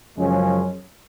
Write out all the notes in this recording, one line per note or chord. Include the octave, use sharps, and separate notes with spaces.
F#2 C#3 F3 G#3 C#4